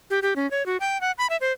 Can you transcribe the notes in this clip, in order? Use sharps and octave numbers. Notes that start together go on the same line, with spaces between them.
G4
G4
C#4
C#5
F#4
G5
F#5
B5
E5
C5